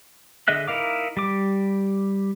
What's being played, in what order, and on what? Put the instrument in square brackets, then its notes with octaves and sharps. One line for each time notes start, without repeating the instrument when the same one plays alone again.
[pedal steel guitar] D3 G#4 D#5 E5 F#6
D#4 E4 A#4 F5 D6
G3 D6